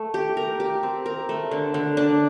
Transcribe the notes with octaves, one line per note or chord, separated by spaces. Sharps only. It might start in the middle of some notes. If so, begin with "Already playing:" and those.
Already playing: A3
G4
A#4
G4
C4
A#4
A3
D3
D3
D4